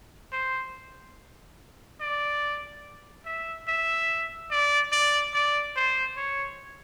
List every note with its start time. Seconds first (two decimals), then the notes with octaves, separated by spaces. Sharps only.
0.33 C5
2.01 D5
3.25 E5
3.68 E5
4.51 D5
4.92 D5
5.34 D5
5.76 C5
6.17 C#5